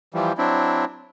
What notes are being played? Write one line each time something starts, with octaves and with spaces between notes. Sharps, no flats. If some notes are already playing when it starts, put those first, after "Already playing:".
E3 F3 G3
F#3 C4 D4 E4